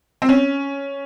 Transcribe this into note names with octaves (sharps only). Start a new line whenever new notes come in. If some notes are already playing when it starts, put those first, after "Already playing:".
C4
C#4